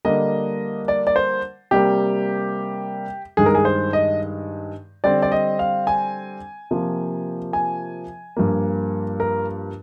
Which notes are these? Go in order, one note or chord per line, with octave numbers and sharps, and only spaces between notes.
D3 G3 A#3 D#5
D5
D5
C5
C3 G3 A#3 G4
G2 D#3 G#3 G#4
A#4
G#4
C5
D#5
D3 G3 C4 D5
D5
D#5
F5
G#5
C3 F3 A#3
G#5
G2 F3 A#3
A#4